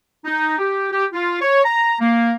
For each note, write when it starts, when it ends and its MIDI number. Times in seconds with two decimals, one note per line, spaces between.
0.25 0.56 63
0.59 0.90 67
0.92 1.05 67
1.13 1.37 65
1.41 1.61 73
1.64 1.94 82
2.00 2.33 58